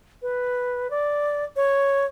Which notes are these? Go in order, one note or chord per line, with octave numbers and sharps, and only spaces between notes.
B4
D5
C#5